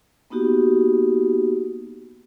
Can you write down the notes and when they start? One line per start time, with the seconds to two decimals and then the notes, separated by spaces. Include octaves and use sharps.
0.30 A#3 B3 D#4 F#4 G4